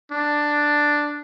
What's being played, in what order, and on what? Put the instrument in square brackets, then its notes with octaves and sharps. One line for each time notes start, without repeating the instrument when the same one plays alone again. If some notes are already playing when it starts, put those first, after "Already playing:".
[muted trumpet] D4